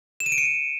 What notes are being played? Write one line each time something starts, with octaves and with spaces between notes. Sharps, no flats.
E7
D#7
D7
C#7